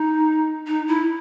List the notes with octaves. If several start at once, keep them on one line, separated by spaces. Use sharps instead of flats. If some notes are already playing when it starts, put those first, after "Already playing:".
Already playing: D#4
D#4
E4